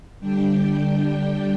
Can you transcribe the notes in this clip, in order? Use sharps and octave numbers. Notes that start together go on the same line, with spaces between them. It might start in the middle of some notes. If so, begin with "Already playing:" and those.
D3 G3 D4 G5
G5